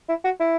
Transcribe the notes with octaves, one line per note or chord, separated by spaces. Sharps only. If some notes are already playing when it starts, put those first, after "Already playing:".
E4
F#4
E4